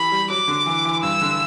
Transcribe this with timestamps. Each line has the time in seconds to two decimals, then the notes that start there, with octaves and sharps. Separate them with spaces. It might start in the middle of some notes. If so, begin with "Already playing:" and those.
Already playing: E3 G4 B5
0.12 G3
0.30 F#3 D6
0.48 D3
0.66 E3
0.85 E3
1.02 G2 E6
1.21 D3